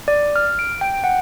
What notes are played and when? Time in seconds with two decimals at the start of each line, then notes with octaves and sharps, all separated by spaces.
0.08 D5
0.36 F6
0.59 D7
0.81 G5
1.04 F#5